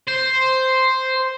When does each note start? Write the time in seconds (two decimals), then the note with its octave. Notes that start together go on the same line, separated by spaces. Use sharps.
0.08 C5